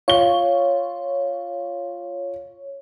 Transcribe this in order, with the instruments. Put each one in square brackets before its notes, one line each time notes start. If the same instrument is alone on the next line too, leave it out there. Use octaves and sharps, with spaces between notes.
[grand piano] F4 G7 [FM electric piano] C#5